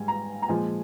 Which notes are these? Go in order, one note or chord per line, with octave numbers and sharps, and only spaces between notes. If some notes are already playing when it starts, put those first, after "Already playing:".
Already playing: G#2 G3 G#5
A#5
A#5
A#2 F3 G#3 G#5